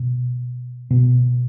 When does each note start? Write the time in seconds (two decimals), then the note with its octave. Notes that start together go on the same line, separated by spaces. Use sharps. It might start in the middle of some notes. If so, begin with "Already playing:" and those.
Already playing: B2
0.90 B2